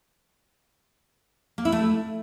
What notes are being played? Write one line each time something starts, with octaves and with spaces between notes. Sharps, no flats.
A#3
E4
A3